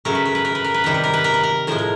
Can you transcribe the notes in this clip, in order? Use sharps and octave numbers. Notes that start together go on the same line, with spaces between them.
C#3 F#3 A3 A#4
B4
A#4
B4
A#4
B4
A#4
B4
C3 D#3 G3 A#4
B4
A#4
B4
A#4
B4
A#4
A2 F3 G#3 A#4
A#4